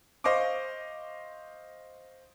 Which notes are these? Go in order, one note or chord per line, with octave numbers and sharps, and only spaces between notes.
C5 D#5 F5 C#6 D6